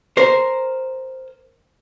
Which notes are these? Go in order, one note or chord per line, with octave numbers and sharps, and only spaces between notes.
A#4 C5